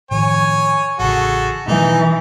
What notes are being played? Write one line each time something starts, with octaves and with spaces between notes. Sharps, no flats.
A2 D#3 F3 C#5 G#5
A1 C#3 F#4 G#4 A4
B2 E3 D#4